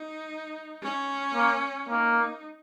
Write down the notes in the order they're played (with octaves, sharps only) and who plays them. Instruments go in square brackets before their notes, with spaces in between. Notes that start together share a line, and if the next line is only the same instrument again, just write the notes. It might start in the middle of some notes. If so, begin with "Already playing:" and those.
Already playing: [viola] D#4
C#4
[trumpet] A#3
[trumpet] A#3 [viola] D#4